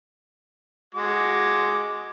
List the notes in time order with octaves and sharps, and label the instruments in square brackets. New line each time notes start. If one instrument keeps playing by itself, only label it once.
[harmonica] G#3 F#4 D6